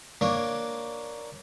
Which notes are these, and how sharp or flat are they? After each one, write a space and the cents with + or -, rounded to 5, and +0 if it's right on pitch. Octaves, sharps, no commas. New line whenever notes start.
A#3 +5 D4 +5 C#5 +0